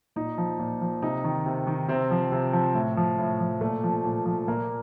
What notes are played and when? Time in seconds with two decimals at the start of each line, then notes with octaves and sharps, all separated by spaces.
0.16 A#2 D#4
0.38 F3
0.59 A#2
0.81 F3
1.03 C3 D#4
1.24 D#3
1.46 C3
1.67 D#3
1.88 C3 C4
2.11 F3
2.32 C3
2.53 F3
2.75 A2
2.97 F3
3.19 A2
3.40 F3
3.61 A#2 A3
3.84 F3
4.04 A#2
4.26 F3
4.48 A#2 A#3